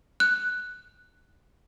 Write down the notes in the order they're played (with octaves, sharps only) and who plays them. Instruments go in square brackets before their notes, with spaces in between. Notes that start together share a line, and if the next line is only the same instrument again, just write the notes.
[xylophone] F#6